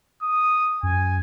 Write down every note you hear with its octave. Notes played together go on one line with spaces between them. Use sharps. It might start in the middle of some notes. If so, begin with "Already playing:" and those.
D#6
F#2 G#5